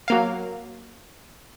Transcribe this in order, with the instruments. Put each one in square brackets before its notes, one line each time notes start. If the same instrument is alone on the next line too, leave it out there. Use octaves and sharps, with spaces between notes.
[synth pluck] F#3 A#3 F5